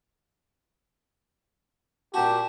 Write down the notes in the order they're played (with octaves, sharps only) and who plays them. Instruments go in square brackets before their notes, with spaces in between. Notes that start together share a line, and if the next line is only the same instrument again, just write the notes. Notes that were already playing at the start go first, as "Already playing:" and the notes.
[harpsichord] A#2 F#4 [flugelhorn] G4 [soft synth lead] A5